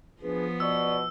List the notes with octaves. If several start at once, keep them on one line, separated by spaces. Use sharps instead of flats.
F3 B3 D4 G#4 B4
B2 D5 C#6 E6